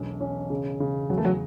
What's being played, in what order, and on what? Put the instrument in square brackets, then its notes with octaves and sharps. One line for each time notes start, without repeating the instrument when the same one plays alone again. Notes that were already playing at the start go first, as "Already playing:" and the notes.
Already playing: [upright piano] E1 B1 C#4
C#4
C#3
C#3
[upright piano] E2 [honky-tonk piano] F#3
[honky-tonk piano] A3
F#3